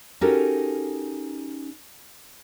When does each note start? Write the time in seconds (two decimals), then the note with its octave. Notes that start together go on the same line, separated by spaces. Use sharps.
0.21 C#4 D#4 F#4 G4 A4 A#4